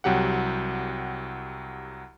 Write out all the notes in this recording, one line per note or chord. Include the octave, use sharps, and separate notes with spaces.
C2 F#3 G4 F#5